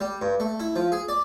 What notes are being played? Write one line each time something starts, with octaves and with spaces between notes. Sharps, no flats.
G3
G2
A3
E4
F3
G#4
D5